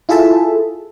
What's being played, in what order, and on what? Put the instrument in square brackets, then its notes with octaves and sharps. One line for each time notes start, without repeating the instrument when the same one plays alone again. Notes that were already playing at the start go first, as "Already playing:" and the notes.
[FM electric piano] E4 F4 G#4 A4 E5 A5